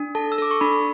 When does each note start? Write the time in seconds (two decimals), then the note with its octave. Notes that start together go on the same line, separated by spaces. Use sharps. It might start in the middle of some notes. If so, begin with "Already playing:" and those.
Already playing: D4
0.15 A4 A5
0.32 E6
0.38 A4 D6
0.51 C#6
0.61 D4 B5